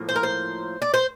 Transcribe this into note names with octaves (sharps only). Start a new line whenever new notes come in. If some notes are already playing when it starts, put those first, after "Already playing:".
Already playing: A2 F3 A#3
C5
A#4
C5
D5
C5